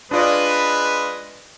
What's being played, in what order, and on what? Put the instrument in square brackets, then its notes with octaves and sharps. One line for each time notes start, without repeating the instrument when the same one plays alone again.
[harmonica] G#3 D#6 [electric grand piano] D4 F4 D5 [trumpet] B4